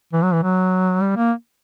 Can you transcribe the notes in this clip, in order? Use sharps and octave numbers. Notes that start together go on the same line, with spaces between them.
E3
F#3
E3
F#3
G3
A#3